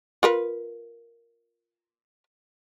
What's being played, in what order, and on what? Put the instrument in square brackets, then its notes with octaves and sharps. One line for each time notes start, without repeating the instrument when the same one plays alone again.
[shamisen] F4 A#4 B4